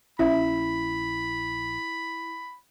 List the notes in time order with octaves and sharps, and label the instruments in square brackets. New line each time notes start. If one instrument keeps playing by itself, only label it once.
[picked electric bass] A#1 [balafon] C#4 E5 [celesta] E4 [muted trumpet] B5